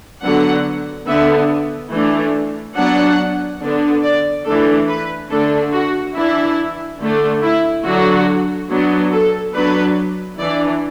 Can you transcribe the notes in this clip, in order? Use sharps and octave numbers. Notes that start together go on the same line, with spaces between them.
D3 F#3 B3 D4 F#5
D3 B3 D4 E5
E3 A3 D4
F#3 B3 D4 F#5
D3 B3 D4
D5
E3 A3 D4 A4
B4
D3 A3 D4 A4
F#4
E3 D4 E4
D3 A3 D4
E4
D3 F#3 D4 F#4
F#3 B3 D4
A4
F#3 B3 D4 B4
E3 D4 D5